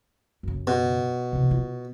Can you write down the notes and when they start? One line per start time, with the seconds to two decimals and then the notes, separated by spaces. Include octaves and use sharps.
0.43 F#2 C#3
0.67 B2
1.33 C3 E3
1.51 F4